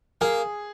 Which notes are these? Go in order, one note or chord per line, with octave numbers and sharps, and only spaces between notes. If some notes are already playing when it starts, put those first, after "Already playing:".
A#3 G#4